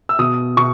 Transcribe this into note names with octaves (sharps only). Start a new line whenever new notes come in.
E6
B2 D#6
B2 C#6